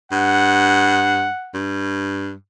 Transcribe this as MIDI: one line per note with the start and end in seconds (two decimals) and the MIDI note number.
0.12 1.29 43
0.12 1.57 78
1.54 2.33 43